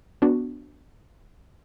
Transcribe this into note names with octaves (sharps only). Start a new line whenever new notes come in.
B3 D4 F#4